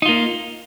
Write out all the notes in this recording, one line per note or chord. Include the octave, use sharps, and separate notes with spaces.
A#3 D#4 F4